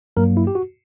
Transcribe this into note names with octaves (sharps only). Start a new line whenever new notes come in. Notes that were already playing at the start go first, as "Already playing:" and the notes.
G2 F#3 A#3 A#4
E4
G4
F#4